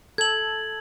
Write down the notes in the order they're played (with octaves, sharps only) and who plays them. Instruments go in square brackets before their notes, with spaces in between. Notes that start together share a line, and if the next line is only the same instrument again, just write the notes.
[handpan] A4 [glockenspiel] G#6 F#7